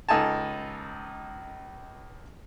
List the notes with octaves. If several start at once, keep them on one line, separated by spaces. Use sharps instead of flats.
C#2 D#4 A4 G#5 A5